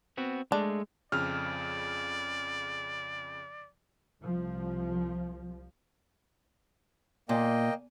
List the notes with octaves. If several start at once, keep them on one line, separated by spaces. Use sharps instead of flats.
B3 C4 F#4
G#3 A3 D4
F2 C#3 D5 F6
C2 F3
A#2 A#3 D#5 G5